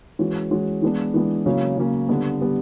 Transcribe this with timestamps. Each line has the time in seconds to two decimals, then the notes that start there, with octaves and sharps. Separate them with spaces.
0.19 E3 G#3 C#4 F#4
0.51 E3 G#3 C#4 F#4
0.82 E3 G#3 B3 D4
1.14 E3 G#3 B3 D4
1.46 C#3 F#3 A#3 C#4
1.77 C#3 F#3 A#3 C#4
2.09 D3 G3 B3
2.41 D3 G3 B3